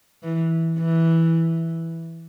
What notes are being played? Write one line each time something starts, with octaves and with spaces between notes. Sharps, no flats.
E3
E3